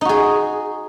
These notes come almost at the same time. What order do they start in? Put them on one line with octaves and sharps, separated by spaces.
D#4 F#4 G#4